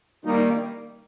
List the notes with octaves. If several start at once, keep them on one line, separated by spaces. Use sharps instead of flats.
D#3 G3 A#3 D#4